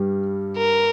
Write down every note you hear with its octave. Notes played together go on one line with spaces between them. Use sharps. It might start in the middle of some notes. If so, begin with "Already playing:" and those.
Already playing: G2 G3
A#4